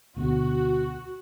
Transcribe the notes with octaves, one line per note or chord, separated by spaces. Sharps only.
D2 B2 F#4